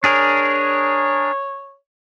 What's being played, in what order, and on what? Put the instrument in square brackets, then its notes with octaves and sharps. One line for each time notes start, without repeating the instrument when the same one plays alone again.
[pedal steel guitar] D4 G#4 A#4 [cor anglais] C#5